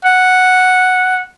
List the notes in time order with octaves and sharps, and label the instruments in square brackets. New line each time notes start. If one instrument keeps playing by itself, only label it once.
[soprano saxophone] F#5